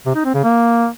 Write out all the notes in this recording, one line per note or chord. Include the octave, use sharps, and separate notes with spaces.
C3
D#4
C4
C#3
A#3